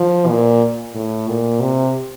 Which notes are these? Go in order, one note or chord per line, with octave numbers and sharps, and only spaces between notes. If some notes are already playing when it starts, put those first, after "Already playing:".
Already playing: F3
A#2
A2
A#2
C3